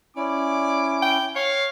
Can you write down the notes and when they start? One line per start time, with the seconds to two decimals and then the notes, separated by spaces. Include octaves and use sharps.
0.17 C#4 E4 D5 D6
1.02 G5
1.36 C#5 F5